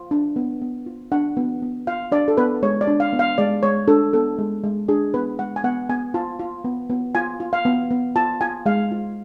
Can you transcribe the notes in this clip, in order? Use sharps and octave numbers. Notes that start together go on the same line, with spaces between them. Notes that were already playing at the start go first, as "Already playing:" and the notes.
Already playing: F4
D4
B3
B3
F4
D4 F#5
B3
B3
F4 F5
D4 D5
A4
B3 B4
G#3 C#5
D5
D4
F5
B3
F5
G#3 D5
G#3 C#5
D4 A4
B3 A4
G#3
G#3
D4 G#4
B3 B4
G#3 F#5
G#5
B3 F#5
B3 G#5
F4 A5
F4
B3
B3
F4 G#5
F4
F5
B3
B3
F4 A5
F4 G#5
G#3 F5
F4